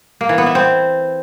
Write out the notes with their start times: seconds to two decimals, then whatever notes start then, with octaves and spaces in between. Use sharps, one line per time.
0.21 A#3
0.29 E3
0.38 B3
0.46 E4
0.55 C4